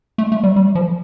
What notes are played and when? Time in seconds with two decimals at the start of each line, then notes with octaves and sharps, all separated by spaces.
0.18 A3
0.32 A3
0.43 G3
0.56 G3
0.75 F3